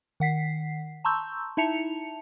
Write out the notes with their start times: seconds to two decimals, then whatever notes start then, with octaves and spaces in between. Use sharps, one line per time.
0.20 D#3 F#5 B6 C7
1.05 A5 A#5 C6 C#6 E6 G6
1.57 D#4 E4 E5 A5 C#7 F7